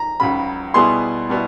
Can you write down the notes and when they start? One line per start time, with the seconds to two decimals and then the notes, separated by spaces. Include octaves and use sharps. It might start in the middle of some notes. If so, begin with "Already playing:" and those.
Already playing: A#5
0.20 C#2 C#3 F#3 B5
0.74 B2 G3 B3 E4 G#4 C6
1.29 B2 G3 B3 E4